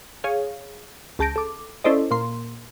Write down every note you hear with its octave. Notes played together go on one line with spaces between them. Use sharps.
G#4 C#5 F5
C#2 G#4 A5 G6 A#6 D7
A4 D6
C#4 E4 A4 C5 D5 D#5
A#2 A#3 C6